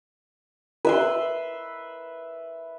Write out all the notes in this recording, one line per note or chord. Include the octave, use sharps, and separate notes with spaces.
B4 E5 C6